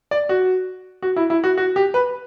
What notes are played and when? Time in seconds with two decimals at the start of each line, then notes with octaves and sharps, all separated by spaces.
0.11 D5
0.29 F#4
1.02 F#4
1.16 E4
1.30 E4
1.44 F#4
1.57 F#4
1.76 G4
1.94 B4